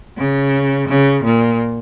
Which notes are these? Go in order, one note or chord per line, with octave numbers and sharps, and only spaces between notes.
C#3
C#3
A#2